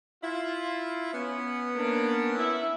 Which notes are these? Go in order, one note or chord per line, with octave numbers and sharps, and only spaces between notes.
E4 F4
B3 C#4
A#3 D4
E4 E5